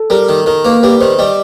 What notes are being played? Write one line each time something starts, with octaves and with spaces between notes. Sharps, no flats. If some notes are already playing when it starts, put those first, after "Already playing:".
Already playing: A4
G3 A#4
D#3
D#3 A#4
A#3 B4
G3 B4
D#3 C5
G3 D#5